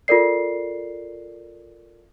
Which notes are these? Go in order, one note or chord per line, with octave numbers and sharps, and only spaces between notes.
F4 A4 A#4 D5 C7